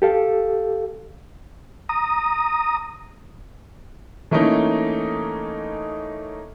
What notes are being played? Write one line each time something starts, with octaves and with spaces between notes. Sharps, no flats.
G4 A4 F5
A#5 D#6
E3 A3 A#3 C#4 D#4